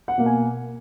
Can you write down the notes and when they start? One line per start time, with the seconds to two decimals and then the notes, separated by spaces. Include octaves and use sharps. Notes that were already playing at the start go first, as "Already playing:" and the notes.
0.08 F#5
0.18 B2 A#3
0.26 G#5